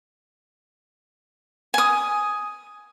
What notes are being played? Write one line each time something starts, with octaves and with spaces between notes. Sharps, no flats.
G#5 D#6